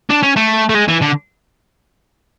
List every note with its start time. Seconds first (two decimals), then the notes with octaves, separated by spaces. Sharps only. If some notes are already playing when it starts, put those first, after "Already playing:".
0.10 D4
0.23 C#4
0.37 A3
0.70 A3
0.75 G#3
0.88 E3
1.01 D3